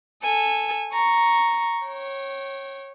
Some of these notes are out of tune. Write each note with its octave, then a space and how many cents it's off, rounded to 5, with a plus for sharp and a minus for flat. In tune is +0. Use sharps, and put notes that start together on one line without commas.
A4 +0 G#5 -10
A#5 +0 C#6 +0
C#5 -20 G5 -25